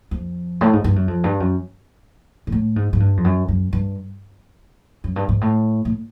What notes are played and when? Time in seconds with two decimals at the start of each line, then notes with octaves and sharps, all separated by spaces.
0.11 F2
0.61 A2
0.73 G#2
0.84 G2
0.96 F#2
1.08 F2
1.24 G2
1.40 F#2
2.47 G#2
2.52 A2
2.76 G#2
2.93 G#2
3.00 G2
3.17 F2
3.24 F#2
3.48 F#2
3.73 G2
5.04 F#2
5.16 G2
5.29 G#2
5.41 A2
5.85 A2